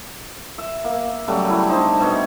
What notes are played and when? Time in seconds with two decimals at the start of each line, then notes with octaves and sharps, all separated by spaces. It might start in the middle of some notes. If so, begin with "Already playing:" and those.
0.58 E5
0.84 A#3
1.28 C#3 F#3 G3 A3
1.50 E4 G5
1.68 D4 D#4 C5
2.00 B2 B3 C#5 E5